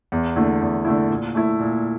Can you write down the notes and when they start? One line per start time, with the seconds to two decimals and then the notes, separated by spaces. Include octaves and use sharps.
0.12 E2
0.36 D3 A3 E4
0.61 E2
0.85 D3 A3 E4
1.10 A#2
1.35 A3 E4
1.60 A#2